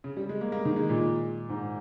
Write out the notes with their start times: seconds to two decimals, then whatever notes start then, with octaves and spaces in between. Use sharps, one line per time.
0.04 C#3
0.17 G3
0.29 G#3
0.41 A#3
0.52 A#3
0.65 D#3
0.76 G#3
0.89 A#2
1.49 G#2